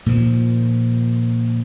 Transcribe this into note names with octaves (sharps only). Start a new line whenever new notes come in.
A#2 D#3 F3